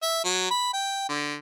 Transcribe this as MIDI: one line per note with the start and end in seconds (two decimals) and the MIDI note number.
0.02 0.21 76
0.24 0.49 54
0.51 0.69 83
0.73 1.08 79
1.09 1.36 50